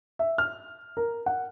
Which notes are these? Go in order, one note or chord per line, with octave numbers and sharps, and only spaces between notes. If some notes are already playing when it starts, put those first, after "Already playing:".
E5
F6
A#4
F#5